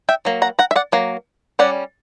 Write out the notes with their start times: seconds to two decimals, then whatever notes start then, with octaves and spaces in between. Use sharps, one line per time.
0.09 E5 G5
0.25 F#3 A#3
0.42 F#5 A#5
0.59 F#5 A#5
0.71 E5
0.76 D5 F#5
0.92 F#3 A#3
1.59 G3 C#4 D5 F#5